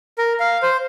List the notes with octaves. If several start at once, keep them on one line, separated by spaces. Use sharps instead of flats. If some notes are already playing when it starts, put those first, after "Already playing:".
A#4
F5
C5